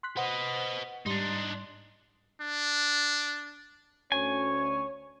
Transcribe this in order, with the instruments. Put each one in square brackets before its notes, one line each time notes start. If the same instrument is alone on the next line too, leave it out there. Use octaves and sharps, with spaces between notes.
[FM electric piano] C6 F#6 B6
[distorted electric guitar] B4 D#5 [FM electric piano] C5 F#5
[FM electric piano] G#2 G3 C6 [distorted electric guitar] D4 D#4
[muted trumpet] D4
[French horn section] D2 C#4 [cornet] C#5 [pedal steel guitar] G#5